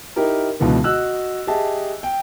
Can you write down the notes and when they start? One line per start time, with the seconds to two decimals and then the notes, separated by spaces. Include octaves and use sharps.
0.16 D#4 E4 G4 A#4
0.60 C#2 B2 D3 E3 B3
0.84 F#4 D#5 E6 F#6
1.47 G4 G#4 D#5 E5 A5
2.03 G5